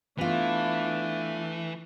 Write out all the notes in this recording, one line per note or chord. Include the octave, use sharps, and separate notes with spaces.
E3 A3 B3 D4 F4